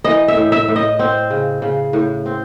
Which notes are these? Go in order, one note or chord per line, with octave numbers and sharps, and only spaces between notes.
E3 D#5
E5
A2
E5
A2
D#5
C4
C#3
C#3
A2
C4